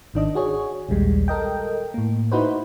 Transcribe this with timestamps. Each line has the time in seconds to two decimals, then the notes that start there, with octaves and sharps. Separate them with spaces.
0.14 G#1 D#3 D4 D#5
0.35 F#4 G#4 C#5
0.89 A#1 D#2 G3 G#3
1.28 A4 A#4 D#5 G5
1.94 A2 A#3
2.32 D#4 E4 F#4 B4 C5